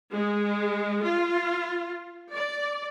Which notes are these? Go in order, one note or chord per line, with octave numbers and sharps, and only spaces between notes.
G#3
F4
D5